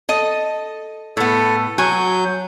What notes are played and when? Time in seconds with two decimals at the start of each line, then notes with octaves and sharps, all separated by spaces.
0.09 A4 D#5
1.17 A2 B3 A4
1.78 F#3 F#4 G#5 G6